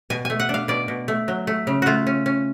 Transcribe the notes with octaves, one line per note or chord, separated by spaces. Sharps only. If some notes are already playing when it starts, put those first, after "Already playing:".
B2 G#5
A3 G#5
F#5
D4
F5
B2 D5
B2
A3
F#3
A3
C#3
A3 F4 F#4
C#4
C#4